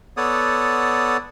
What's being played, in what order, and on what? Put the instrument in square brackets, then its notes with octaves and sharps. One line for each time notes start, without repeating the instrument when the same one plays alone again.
[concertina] B3 A4 C#5 D5 F#5 D#6